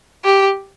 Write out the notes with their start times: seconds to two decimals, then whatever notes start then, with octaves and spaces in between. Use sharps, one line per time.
0.25 G4